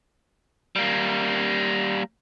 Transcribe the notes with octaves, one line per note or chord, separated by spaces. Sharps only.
G3 A#3